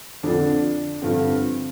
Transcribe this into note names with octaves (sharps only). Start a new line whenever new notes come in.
F2 D3 F3 D4
G2 D3 F3 C4